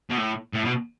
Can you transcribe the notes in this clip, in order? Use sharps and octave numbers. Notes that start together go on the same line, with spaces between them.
B2
A2
A2
B2